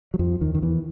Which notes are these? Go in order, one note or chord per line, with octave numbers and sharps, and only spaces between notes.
F#3
F2 F3
D#2 D#3
D#3
E2 E3